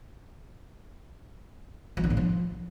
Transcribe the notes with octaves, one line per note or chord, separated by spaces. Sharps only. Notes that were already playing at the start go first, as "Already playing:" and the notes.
F3
D3
A2
F3